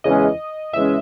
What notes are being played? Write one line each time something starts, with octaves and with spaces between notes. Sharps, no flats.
E2 C#3 E3 G#3 C#4 D#5
E2 C#3 E3 G#3 C#4 E5